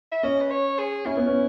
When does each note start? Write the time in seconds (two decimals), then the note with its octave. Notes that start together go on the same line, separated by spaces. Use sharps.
0.12 E5
0.23 C#4 D#5
0.41 B4
0.50 C#5
0.79 G#4
1.05 C#4 E4
1.17 B3
1.26 C#4